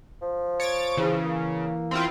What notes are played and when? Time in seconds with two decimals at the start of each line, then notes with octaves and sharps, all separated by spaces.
0.22 F3
0.60 C#5 A6 D7
0.97 C#3 E3
1.24 A#3
1.91 C4 E4 F4